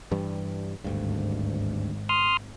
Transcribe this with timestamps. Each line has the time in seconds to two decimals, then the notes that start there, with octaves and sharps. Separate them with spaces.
0.11 G2 E3 G3
0.84 G#1 D2 G2
2.09 C6 D#6 F6